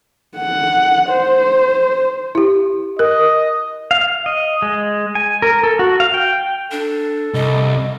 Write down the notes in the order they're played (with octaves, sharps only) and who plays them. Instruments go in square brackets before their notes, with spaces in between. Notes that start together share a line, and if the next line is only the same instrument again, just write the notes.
[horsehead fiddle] F#5
C5
[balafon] E4 G4
[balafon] A#4 [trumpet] D#5
[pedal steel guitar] F5
D#5
G#3
G#5
A#4
A4
F#4
F5
G5
[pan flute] D4 [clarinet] A4
[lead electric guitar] C2 [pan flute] D#5